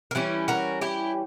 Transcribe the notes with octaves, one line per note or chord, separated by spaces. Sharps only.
A#4
E3 G3 C#4 E4 G4
F#4 A#4
E4 G4